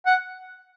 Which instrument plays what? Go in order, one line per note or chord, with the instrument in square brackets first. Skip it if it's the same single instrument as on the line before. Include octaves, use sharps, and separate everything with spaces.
[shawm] F#5